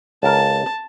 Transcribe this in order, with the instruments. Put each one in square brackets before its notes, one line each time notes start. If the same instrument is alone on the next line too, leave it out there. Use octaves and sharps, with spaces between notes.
[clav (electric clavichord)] C#2 A#4 [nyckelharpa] A5